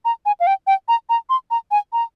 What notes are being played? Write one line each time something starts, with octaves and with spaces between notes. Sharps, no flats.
A#5
G#5
F5
G5
G5
A#5
A#5
C6
A#5
G#5
A#5